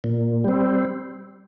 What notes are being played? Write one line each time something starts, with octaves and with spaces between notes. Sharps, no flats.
A#2
G3 C4